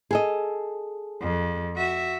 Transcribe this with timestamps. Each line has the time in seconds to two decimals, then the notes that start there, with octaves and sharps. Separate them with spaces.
0.11 G#4 A4 D#5
1.22 F2
1.77 F#4 E5